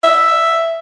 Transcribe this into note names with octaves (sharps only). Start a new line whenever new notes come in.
E5